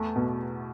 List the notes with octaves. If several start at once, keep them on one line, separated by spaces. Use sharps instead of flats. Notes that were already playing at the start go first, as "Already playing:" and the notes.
Already playing: E2 A3
B2